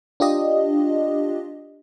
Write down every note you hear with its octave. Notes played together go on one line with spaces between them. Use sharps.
D4 F4 G4 D#5